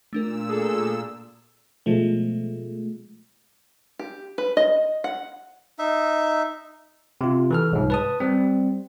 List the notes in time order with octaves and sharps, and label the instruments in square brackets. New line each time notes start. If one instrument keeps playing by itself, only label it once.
[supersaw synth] A#2 E6 [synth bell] A3 D4 A#4
[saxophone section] G#4 A4
[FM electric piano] B2 F3 G#3 A3
[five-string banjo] G4
B4
D#5
F#5
[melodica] D#4 E5
[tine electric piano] C3 F4
E3 A4 F6
C2 G#2
B4 A5 D#6
G3 C4